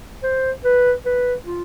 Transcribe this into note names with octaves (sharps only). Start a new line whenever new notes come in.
C5
B4
B4
F4